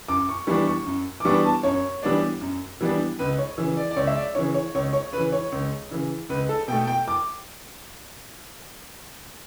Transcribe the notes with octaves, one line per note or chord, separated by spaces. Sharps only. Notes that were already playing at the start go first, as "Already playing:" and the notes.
F#2 D6
C#6
E3 G3 B3 D4 C#6
C#6
F#2
D6
E3 G3 B3 D4 C#6
A5
F#2 C#5
E3 G3 B3 D4
F#2
E3 G3 B3 D4
C#2 B4
C#5
C#3 E3
D5
D5
C#2 C#5
E5
D5
C#3 E3 C#5
C#5
C#2 C#5
C#5
C#3 B4
E3
C#5
C#2
C#3 E3
C#2 B4
A4
B2 A3 G5
G5
D6